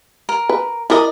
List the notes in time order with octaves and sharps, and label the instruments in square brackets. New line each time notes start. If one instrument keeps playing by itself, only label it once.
[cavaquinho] A#4
[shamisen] B4
[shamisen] E4 A#4 [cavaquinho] D5 D#5